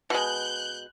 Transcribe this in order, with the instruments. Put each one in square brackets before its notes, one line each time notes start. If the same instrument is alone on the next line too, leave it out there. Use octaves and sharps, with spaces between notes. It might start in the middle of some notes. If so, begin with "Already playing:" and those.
[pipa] B2 G#3 [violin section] F#6 G6